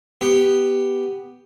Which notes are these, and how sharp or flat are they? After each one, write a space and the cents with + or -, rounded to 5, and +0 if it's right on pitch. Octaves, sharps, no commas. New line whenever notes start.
B3 +0 G4 +0